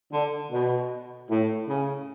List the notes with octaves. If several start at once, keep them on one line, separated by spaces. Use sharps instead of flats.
D3
B2
A2
C#3